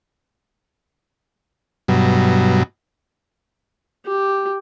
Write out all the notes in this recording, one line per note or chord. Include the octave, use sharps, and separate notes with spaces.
G2 B2 F#3
G4